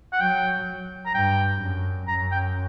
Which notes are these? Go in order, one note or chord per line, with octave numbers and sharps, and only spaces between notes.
F#5
F#3 G5
A#5
G2 G5
F#2
F#2 A#5
G5